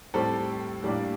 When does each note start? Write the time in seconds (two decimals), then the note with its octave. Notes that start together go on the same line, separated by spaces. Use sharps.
0.14 A2 G3 C4 A4
0.83 A2 G3 A#3 D4